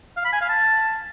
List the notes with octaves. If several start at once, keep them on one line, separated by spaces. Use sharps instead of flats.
F5
B5
G#5
F5
A5